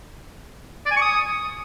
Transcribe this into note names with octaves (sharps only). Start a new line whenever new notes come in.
D5
G#5
C#6
D#6